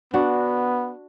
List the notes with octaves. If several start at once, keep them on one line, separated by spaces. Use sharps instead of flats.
B3 D4 F#4